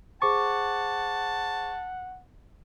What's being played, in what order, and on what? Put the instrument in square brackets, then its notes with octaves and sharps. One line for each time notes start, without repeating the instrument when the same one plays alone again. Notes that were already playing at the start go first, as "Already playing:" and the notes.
[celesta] G#4 C5 D6 [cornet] F#5 [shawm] A5 [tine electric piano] C#6